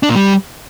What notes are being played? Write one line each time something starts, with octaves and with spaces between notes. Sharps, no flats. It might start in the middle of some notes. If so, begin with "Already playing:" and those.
D4
A#2
G3